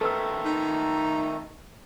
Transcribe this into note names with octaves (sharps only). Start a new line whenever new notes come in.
D#3 A3 A4 B4 E6
D#4